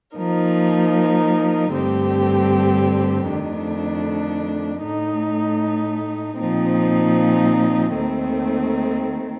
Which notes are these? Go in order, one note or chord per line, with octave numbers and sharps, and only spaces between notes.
F3 A#3 D#4 A#4
G2 D3 A3 C4 G4
F2 D#3 A3 D4
A2 A3 D#4
A#2 F3 C4 D#4
D#2 D#3 A3 C4